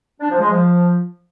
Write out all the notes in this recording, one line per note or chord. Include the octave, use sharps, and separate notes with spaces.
D4
F3
G#3
F3